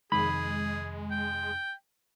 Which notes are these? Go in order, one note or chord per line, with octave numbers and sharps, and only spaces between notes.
F2 C3 D#3 G#3 G#4 B5
G5